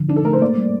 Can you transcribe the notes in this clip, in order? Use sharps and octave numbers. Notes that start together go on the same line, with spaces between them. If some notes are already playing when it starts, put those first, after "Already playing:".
Already playing: D3 F3
D4 D#4
A4
A3 A#4
C5
A#3 D5
G3